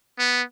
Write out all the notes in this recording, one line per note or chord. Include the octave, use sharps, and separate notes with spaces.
B3